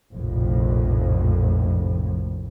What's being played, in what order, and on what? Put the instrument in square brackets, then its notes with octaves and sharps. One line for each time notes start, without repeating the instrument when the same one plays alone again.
[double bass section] F1 A#1 F2 A2